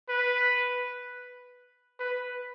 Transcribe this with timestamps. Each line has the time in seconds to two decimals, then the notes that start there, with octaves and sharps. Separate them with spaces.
0.09 B4
2.00 B4